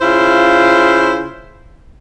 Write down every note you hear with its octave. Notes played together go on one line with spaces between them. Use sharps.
C#3 E4 F4 C5